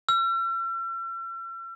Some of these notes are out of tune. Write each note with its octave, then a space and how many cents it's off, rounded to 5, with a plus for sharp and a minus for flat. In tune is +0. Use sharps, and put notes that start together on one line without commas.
E6 +45